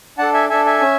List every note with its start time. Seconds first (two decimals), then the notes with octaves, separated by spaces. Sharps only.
0.18 D4 A4 F#5 A5
0.34 E5 G#5
0.50 D4 A4 E5 G#5
0.66 E5 G#5
0.81 C#4